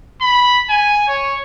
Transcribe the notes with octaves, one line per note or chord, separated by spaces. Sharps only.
B5
G#5
C#5